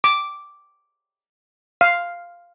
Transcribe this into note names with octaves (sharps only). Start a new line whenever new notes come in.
D6
F5